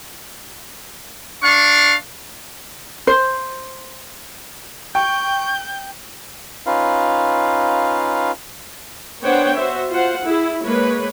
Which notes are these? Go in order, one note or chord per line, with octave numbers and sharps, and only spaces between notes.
D4 F5 C#6
C5
G5 C#6 G6
C#4 D#4 F4 B4 F5
B3 D4 C5 C#5 F#5 G5
F#4 C5 E5
F4 C5 F#5
E4 G#4
G#3 A#3 B4 C#5